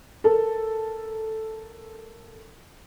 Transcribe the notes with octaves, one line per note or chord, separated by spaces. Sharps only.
A4 A#4